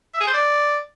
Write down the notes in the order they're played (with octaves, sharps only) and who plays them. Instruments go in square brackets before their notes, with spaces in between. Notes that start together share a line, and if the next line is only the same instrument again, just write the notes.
[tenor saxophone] E5
G#4
C5
D5